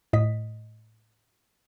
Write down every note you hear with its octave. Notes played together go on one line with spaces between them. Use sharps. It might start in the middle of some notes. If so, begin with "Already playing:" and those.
A2 D#5 B6